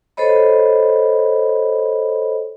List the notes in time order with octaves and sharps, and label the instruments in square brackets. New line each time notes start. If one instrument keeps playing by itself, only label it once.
[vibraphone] A4 C5 C#5 D#5 B5